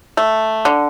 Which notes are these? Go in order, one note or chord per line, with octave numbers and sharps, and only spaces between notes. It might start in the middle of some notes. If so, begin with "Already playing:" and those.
A3
D3